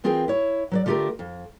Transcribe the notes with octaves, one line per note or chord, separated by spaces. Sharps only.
E3 C4 F4 G#4 A#4 G5
E4 C#5
F#3 B4 D5
D3 A3 F4 G4 A4 A#4
F2